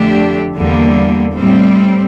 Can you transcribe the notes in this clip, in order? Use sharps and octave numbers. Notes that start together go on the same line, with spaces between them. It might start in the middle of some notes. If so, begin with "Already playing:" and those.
Already playing: F2 D3 A3 D4 G4
E2 D3 G3 A#3
A2 G3 C4